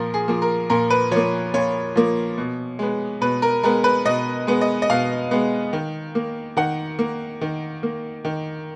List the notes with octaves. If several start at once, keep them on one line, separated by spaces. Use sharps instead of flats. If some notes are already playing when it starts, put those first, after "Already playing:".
Already playing: A#2 F3 A#4
G#4
F3 A#3
A#4
A#2 A#4
B4
F3 A#3 C#5
A#2 C#5
F3 A#3
B2
G#3 B3
B2 B4
A#4
G#3 B3 A#4
B4
B2 D#5
G#3 B3
D#5
D#5
B2 F5
G#3 B3
D#3
A#3
D#3 F#5
A#3
D#3
A#3
D#3